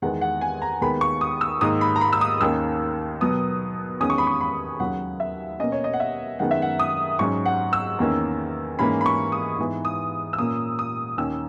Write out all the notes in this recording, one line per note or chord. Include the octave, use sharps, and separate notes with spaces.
E2 D#3 G#3 B3 F#5
F#5
G#5
A#5
D#2 D#3 G#3 B3 B5
C#6
D#6
E6
G#2 D#3 A#3 D#6
B5
A#5
B5
E6
D#6
D#2 D#3 A#3 C#4 E6
B2 F#3 B3 D#6
E2 D#3 G#3 C#4 D#6
C#6
B5
C#6
B5
D#2 C#3 F#3 C#4 F#5
E5
B2 A#3 C#4 D#5
C#5
D#5
F#5
E5
F#2 D#3 G#3 B3 F#5
E5
F#5
D#6
G#2 F#3 C#4 C#6
F#5
E6
E2 D#3 A#3 C#4
G#2 E3 A#3 C#4 B5
B5
C#6
D#6
G#2 E3 B3
D#6
E6
A#2 A#3 C#4 D#6
D#6
D#2 D#3 A#3 C#4 E6